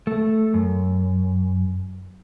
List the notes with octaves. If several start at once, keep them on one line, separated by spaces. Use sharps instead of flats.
A3
F#2